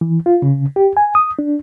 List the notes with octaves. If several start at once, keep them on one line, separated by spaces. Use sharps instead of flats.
E3
F4
C#3
G4
G#5
D#6
D4